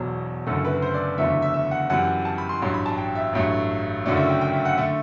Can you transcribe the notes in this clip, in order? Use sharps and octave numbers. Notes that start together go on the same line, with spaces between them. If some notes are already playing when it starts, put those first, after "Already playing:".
Already playing: E1 E2 B2 F#3 C5
F#1 F#2 D3 A3 A4
B4
C5
D5
F#1 E2 D3 F#3 A3 E5
E5
E5
E5
F#5
F#2 E3 G3 F#5
A5
B5
C6
A1 G2 F#3 C6
B5
A5
G5
E5
A1 G2 F#3 A3
F#1 F#2 D3 F#3 A3 D5
E5
G5
G5
E5
F#5
D3 A3 E5